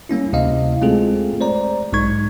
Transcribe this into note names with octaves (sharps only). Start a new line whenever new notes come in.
G3 A#3 C#4 E4
D2 C3 E4 D#5 F5
G#3 A3 C4 F4 G#4 A4
C5 D5 A#5
B1 G#2 G#3 D#4 C#6 G#6